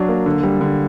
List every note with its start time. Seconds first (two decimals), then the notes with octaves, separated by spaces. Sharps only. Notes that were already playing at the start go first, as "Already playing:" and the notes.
Already playing: F#3 D4
0.08 A#3
0.26 D3
0.43 G3
0.61 D3